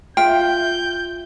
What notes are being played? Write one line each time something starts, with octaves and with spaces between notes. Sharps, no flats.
F4 E5 G5 G6